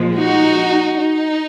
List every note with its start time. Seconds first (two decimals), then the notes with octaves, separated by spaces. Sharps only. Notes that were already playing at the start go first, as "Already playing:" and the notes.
Already playing: A#2 F3 G#3
0.16 D#4 F#4
0.98 D#4